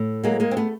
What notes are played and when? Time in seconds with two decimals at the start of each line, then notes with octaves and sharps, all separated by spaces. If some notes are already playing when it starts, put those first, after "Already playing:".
Already playing: A2
0.23 F#3 G#3 A#3
0.40 G#3 A#3
0.51 C4
0.57 A3 B3